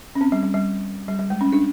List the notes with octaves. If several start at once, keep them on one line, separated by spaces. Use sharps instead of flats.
C#4
C4
G3
G3
G3
G3
G3
G#3
C#4
D4